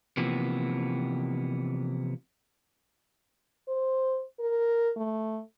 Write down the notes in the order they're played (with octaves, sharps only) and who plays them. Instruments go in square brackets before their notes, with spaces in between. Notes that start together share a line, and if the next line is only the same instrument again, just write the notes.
[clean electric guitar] C3 E3 F3 A#3 B3
[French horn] C5
A#4
A3